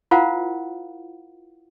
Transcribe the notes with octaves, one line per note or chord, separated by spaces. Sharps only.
E4 F4 A#4 C5 F5 F#5